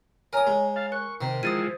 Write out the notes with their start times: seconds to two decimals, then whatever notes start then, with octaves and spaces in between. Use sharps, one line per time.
0.33 A#4 C#5 G#5 A#5 D#6
0.47 G#3
0.76 F5 A5
0.92 A#4 C#6 F#6
1.21 C3 D#3 C5
1.43 E3 F3 G#3 D#6 A6 D#7